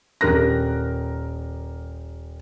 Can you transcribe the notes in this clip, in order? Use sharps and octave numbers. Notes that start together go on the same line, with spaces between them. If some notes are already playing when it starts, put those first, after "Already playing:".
D#1 G4 A#4 F#6 A#6